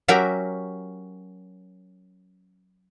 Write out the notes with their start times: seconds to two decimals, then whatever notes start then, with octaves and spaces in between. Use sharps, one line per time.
0.08 F#3 C#4 F#4 G4 A#4 E5